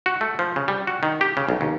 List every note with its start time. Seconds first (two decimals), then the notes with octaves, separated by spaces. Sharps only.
0.06 F#4
0.21 A3
0.39 F3
0.56 C#3
0.68 G3
0.87 F#4
1.03 D#3
1.21 G4
1.37 C#3
1.49 B1
1.61 D#2